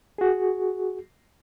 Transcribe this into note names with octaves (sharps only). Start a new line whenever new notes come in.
F#4 G#4